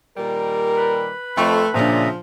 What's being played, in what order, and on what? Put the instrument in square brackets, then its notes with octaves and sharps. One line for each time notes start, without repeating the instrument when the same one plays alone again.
[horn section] A#2 D#3 G3 [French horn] A#4
[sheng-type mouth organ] B4 B5
[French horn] F2 [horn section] A3 [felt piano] G5 C6 C#6
[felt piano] A#2 D4 [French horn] C#3 [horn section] F3 [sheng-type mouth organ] E5 A#5 D#6